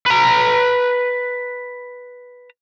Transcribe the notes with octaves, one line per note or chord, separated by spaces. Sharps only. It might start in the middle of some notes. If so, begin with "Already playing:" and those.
B4 A#5